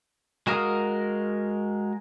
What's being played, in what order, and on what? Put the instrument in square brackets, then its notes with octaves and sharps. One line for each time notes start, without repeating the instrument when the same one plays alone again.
[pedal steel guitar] G#3 F#4 A#4 F5 D#6